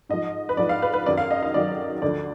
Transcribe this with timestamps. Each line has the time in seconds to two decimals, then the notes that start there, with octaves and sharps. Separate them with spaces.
0.09 G#2 F3 D#5
0.49 B4
0.57 G#2 F3 D5
0.69 F5
0.82 B4
0.94 B4
1.06 F#2 D#3 F#3 D5
1.18 F5
1.31 D#5
1.43 F5
1.53 F#2 D#3 F#3 D5
2.02 D2 D3 F3 D5